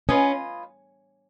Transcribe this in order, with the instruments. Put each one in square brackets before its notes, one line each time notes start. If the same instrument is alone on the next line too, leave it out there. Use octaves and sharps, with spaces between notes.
[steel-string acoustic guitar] C#4 [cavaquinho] F4 B4 D#5 G#5